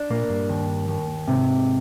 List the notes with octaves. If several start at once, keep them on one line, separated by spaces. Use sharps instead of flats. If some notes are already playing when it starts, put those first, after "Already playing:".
Already playing: D4
A#2 A#3
G2
D#2
D#2
G#2 C3